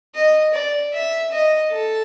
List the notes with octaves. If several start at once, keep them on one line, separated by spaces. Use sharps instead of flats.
D#5
D5
E5
D#5
A4